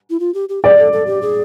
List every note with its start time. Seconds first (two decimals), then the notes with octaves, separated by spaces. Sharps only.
0.10 E4
0.20 F4
0.34 G4
0.49 G4
0.63 G#4 D5
0.78 A4
0.93 A4
1.07 G4
1.22 G#4